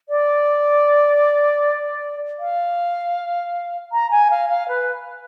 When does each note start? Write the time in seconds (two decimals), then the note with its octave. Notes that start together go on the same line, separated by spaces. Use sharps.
0.09 D5
2.39 F5
3.92 A#5
4.11 G#5
4.30 F5
4.49 F5
4.68 B4